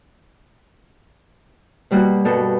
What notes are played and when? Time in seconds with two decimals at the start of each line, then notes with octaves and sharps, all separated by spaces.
1.91 B2 G3 A#3 F#4
2.25 G2 B2 A4 A#4